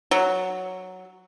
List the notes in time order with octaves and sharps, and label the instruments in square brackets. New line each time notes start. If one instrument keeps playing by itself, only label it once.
[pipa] F#3